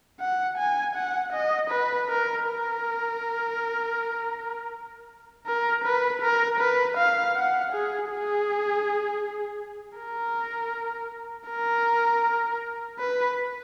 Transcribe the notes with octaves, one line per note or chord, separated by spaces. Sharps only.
F#5
G#5
F#5
D#5
B4
A#4
A#4
A#4
B4
A#4
B4
F5
F#5
G#4
G#4
A#4
A#4
B4